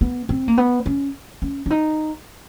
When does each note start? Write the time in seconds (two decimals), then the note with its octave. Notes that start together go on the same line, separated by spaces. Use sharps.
0.01 B3
0.29 C4
0.48 A#3
0.57 B3
0.86 C#4
1.42 C#4
1.66 D4
1.70 D#4